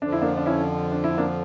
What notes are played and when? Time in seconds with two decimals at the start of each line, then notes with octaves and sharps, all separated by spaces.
0.02 F2 D3 F3 D4
0.12 E4
0.22 A#3 D4
0.37 D4
0.46 C#4 E4
0.91 D4
1.04 E4
1.17 A#3 D4